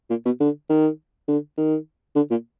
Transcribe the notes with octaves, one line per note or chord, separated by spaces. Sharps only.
A#2
B2
D3
D#3
D3
D#3
D3
A#2